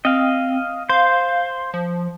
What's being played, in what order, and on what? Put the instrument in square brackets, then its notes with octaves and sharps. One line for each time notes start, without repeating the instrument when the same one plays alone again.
[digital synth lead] C4 [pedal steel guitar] D#5 F5
[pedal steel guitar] C5 [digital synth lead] F5
[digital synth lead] F3